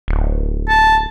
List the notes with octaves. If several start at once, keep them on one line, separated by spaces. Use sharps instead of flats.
D1
A5